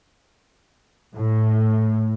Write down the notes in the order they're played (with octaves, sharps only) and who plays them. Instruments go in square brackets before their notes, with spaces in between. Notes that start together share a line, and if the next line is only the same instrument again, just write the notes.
[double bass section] A2